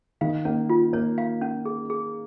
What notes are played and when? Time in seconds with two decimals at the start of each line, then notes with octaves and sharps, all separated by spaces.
0.21 D#3 F5
0.45 A#3 C#4
0.69 F4
0.93 A#3 C#5
1.18 F5
1.41 C#4
1.65 G#4
1.90 G#4